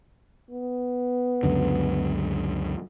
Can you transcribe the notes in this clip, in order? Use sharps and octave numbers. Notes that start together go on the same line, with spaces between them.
B3
C#2 F#2 D3